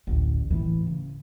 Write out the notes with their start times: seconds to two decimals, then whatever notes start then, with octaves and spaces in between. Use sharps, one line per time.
0.07 A1 D2
0.50 A2 E3
0.87 C#3